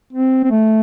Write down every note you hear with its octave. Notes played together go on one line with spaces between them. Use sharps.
C4
C4
A3